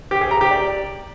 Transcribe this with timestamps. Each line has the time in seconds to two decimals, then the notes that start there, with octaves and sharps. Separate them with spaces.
0.11 G4
0.21 G#4
0.31 A#5
0.41 G4
0.51 D5